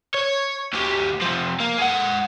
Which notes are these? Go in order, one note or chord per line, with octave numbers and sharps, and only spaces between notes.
C#5
D2 G4
C3 F3
A#3
G#3 F#5